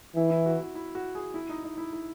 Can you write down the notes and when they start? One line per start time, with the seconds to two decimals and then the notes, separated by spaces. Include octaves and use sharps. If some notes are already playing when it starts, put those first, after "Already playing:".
0.16 E3 E4
0.31 E4
0.46 F#4
0.60 F#4
0.75 E4
0.95 F#4
1.15 G#4
1.34 E4
1.49 D#4
1.64 D#4
1.78 E4
1.93 E4